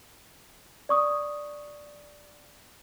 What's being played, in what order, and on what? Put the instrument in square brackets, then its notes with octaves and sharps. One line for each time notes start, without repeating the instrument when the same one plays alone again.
[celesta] D5 C#6 D#6